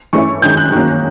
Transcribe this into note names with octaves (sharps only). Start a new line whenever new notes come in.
E3 A3 C#4 E4 C#6
F#2 D#3 G#3 G6
F#6
D#3 F#3 A#3 C#4